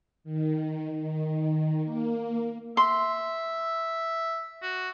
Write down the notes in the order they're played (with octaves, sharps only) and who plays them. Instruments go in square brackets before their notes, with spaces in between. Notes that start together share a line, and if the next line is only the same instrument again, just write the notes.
[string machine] D#3
D#3
A#3
[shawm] E5 [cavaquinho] C6
[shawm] F#4